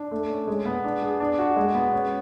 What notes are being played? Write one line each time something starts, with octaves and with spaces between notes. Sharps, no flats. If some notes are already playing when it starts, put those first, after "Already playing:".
Already playing: D4
A3
C#4
G#3
B3
D4
G#4
D4
F#4
G#3
B3
C#4